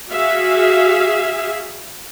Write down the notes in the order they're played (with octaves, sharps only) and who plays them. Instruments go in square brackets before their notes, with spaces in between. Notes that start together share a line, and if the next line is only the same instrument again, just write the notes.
[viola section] F#4 G#4 E5 F5